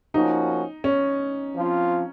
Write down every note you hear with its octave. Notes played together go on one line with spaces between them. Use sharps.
F3 A#3 C#4 D#4 F#4
C#4
F3 C4 F4